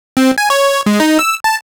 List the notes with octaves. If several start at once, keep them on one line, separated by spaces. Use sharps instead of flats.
C4
G#5
C#5
G#3
D#4
E6
A5